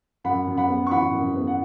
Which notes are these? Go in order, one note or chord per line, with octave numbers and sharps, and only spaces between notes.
F#2 F#5 B5
F#2
F#5 B5
B3
C#6
E3 F#5 B5
F#2
B3
F#5